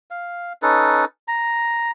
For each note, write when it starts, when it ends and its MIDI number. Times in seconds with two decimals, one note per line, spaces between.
0.11 0.53 77
0.62 1.05 61
0.62 1.05 63
0.62 1.05 69
0.62 1.05 71
1.28 1.91 82